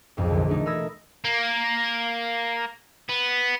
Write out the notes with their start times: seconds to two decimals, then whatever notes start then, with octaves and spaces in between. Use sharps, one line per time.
0.17 B1 F2 G#2
0.30 A#1 E2 D3
0.49 A3 D4 D#4
0.66 A#4 B5 D#6 E6 G#6 A#6
1.25 A#3
3.09 B3